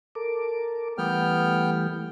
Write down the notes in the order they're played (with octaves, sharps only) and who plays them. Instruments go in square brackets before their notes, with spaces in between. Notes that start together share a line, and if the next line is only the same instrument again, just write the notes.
[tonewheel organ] A4 A#4 D6
[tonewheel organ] E3 G3 A3 [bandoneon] B3 G5 F6